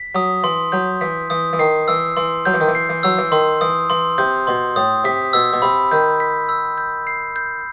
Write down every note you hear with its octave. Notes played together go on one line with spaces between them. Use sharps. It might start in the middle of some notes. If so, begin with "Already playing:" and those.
Already playing: B6
F#3 D#6
E3 C6
F#3 G6
E3 B6
E3 D#6
E3
D#3 C7
E3 E6
E3 C6
F#3 G6
E3
D#3
E3
C7
E3
F#3 E6
E3
D#3 C6
E3 D#6
E3 C6
C3 G6
B2 C6
A2 D#6
C3 B6
B2 E6
B2
C3 B5
D#3 G6
B6
E6
G6
C7
G6